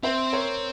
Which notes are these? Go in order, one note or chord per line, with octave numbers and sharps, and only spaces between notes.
C4 C5 E5
A#4 C#5